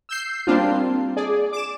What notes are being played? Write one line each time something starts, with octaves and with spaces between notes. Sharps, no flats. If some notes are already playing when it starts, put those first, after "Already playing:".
E6 G6 C7
G3 A#3 C4 D4 F4
G#4 D5
D6 E7